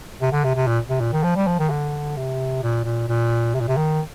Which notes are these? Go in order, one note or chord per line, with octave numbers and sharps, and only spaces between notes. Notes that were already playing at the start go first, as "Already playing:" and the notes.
C3
D3
C3
C3
A#2
C3
A#2
D#3
F3
G3
F3
D#3
D3
C3
A#2
A#2
A#2
C3
A#2
C3
D#3